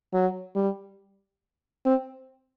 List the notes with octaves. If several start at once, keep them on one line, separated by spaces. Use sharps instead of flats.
F#3
G3
C4